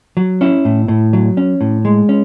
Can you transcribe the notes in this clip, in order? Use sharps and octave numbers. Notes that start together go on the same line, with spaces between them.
F#3
C#4 E4
A2
A2
F#3
C#4
A2
G#3
C#4